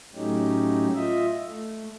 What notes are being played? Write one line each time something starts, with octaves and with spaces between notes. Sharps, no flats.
A2 F#3 A3 C#4 D#4 G4
F4 D#5 E5
A3